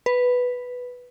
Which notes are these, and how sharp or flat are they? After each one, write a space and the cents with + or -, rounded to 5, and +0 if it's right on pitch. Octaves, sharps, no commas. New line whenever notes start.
B4 +0